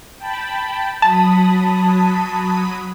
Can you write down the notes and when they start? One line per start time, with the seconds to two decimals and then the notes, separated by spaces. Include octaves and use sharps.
0.18 G5 A5 B5
1.02 F#3 A5 B5 D#6